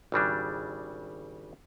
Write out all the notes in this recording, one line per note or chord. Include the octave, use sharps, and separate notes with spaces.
G#1 C#3 G3 D4